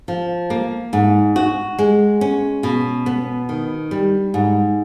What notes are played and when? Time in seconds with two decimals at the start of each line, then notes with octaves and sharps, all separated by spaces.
0.08 F3
0.50 A#3
0.93 G#2
1.36 F#4
1.79 G#3
2.21 C#4
2.63 B2
3.06 B3
3.49 D#3
3.91 G3
4.34 G#2